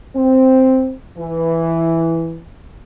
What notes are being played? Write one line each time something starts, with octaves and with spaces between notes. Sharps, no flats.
C4
E3